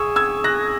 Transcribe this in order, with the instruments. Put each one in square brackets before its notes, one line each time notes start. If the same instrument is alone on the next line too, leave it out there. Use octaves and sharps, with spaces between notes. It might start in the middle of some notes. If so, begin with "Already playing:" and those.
Already playing: [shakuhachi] G#4 [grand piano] C#6 E6
[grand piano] E6 G#6
F#6 A#6